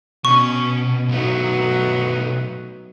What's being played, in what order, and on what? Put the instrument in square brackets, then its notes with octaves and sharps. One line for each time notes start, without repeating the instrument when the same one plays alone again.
[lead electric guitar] B2 [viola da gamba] C#4 [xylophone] C#6
[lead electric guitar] B1 A3 [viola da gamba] F#3 B3 D#4